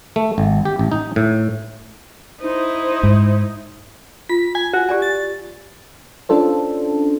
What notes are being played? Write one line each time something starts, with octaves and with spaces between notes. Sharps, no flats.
A3
G#1
G4
A1
D#4
A2
D#4 E4 C5
G#2
F4 B6
G#5
F#4
G4 D5 G#5
A6
C#4 D4 F4 A4 C5